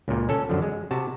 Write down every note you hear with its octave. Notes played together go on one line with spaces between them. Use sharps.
C#2 A#2
C#4 A4
F#2 D3 F3
G#3
C3 F#4 A5